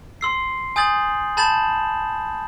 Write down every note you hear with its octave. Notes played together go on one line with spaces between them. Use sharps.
C6 E6 C7
G#5 D#6 G6 A6 F#7
A5 B5 G6 A6 E7 F#7